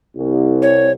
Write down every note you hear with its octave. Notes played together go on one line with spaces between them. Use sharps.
C2
C#5